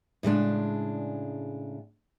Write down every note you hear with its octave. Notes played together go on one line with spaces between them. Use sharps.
A2 C#3 G#3 D4